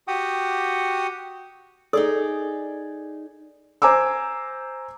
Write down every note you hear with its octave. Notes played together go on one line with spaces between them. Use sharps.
F#4 G4 F#5 G5 D#6
D#4 G#4 A4 D5
C5 G#5 A#5 D6 E6